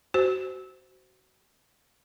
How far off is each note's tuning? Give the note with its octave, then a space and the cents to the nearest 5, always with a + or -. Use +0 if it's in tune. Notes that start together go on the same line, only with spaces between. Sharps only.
F#4 +25 C5 -10